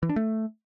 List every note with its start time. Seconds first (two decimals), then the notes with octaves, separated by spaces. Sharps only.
0.03 E3
0.09 D4
0.16 A3